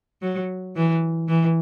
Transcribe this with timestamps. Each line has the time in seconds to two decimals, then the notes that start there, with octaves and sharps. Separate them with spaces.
0.22 F#3
0.76 E3
1.29 E3